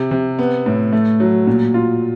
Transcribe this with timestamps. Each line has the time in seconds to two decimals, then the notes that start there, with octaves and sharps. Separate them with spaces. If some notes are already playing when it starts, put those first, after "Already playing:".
Already playing: C3
0.11 C3
0.39 B3
0.66 A2
0.92 A3
1.20 F#3
1.47 A#2
1.74 F4